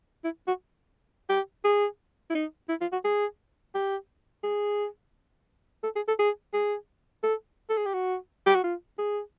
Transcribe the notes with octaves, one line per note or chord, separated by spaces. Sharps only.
E4
F#4
G4
G#4
E4
D#4
E4
F4
F#4
G#4
G4
G#4
A4
G#4
A4
G#4
G#4
A4
A4
G#4
G4
F#4
G4
F#4
F4
G#4